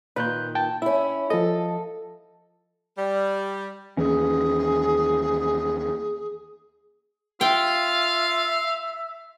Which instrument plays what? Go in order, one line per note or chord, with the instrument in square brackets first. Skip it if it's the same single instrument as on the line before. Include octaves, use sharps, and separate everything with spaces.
[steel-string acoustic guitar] A#2 D#3 [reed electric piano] B4 F#6 G6
[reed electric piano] G5 A5
[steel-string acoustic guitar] C#4 E4 [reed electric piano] E5
[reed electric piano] F3 D#5 [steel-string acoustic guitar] A4
[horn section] G3
[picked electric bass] D#2 E3 C#4 [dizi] G#4
[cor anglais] F4 [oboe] E5 [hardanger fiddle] F5 [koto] G5